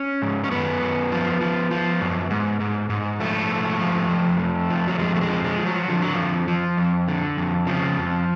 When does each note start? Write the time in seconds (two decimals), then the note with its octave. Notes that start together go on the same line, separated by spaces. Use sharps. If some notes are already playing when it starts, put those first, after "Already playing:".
Already playing: C#4
0.22 G#2
0.44 C#4
0.51 F#2 B3
0.82 F#2
1.12 F3
1.41 F3
1.71 F3
2.01 F#2
2.30 G#2
2.60 G#2
2.90 G#2
3.20 F3 A3
3.50 G#2
3.80 F3
4.09 F2
4.39 F2
4.70 F3
4.88 F#3
4.99 F2 G#3
5.15 A3
5.21 G#3
5.28 F3
5.44 G#3
5.58 F3
5.66 F#3
5.88 D3 F3
6.02 F#3
6.14 F2 F3
6.48 F3
6.77 F2
7.08 D3
7.37 F2
7.67 C#3 F3
7.97 F2